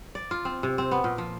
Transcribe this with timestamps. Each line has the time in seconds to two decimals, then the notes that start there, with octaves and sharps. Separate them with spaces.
0.15 D5
0.31 F4
0.45 C4
0.63 C3
0.78 C4
0.91 B3
1.04 A#2
1.18 F3